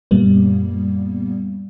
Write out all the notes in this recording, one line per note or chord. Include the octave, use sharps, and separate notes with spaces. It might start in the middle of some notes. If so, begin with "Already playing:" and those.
F#2 A#2 G3 A#3 B3